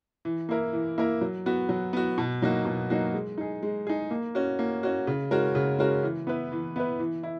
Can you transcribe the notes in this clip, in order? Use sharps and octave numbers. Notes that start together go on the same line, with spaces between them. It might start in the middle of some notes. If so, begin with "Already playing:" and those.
E3
A#3 E4 A#4
E3
A#3 E4 A#4
F#3
B3 F#4
F#3
B3 F#4
B2
F#3 A#3 D#4 F#4
B2
F#3 A#3 D#4 F#4
G#3
D#4 G#4
G#3
D#4 G#4
A#3
C#4 F#4
A#3
C#4 F#4
C#3
G#3 C#4 F#4 A#4
C#3
G#3 C#4 F#4 A#4
E3
B3 E4 B4
E3
B3 E4 B4
E3
E4